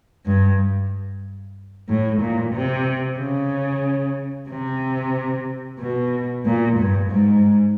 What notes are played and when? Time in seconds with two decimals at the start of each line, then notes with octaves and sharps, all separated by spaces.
0.26 G2
1.89 A2
2.21 A#2
2.54 C3
3.19 C#3
4.50 C3
5.80 B2
6.45 A#2
6.79 G2
7.11 G#2